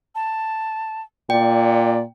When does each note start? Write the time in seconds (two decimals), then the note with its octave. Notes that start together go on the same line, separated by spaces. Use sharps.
0.15 A5
1.30 A#2 D5 G5